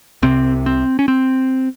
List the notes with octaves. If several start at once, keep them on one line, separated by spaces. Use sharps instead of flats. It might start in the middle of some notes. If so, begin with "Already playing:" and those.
C2 C3 C4
C4
C#4
C4